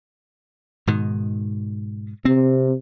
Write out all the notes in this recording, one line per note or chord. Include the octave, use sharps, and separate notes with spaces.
G#2 B2 D#3
C3 C4